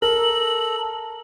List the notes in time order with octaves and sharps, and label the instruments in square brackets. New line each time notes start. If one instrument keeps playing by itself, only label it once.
[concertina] A4 A#5 [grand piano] A#4 [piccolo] F#7